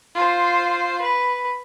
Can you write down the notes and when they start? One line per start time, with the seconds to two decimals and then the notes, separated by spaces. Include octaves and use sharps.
0.15 F4 C5
1.01 B4